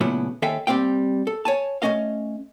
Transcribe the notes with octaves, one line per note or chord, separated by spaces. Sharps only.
A#2 C#3 F#3 A3 B3 E4
D#2 A4 E5 F5 G5 G#5
G3 A#3 C4 F5 G5
A4
C#5 G#5 A5
A3 A#3 C#4 D#5 F5